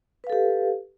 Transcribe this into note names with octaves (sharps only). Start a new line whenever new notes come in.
G4 A4 B4 F5